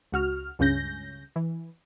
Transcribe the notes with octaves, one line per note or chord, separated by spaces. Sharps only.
C#2 F#4 F6
C#2 G2 C#3 C#4 G6 A#6
E3